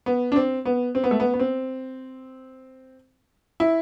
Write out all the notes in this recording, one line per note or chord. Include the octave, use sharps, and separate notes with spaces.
B3
D4
C4
B3
C4
B3
A3
B3
B3
C4
E4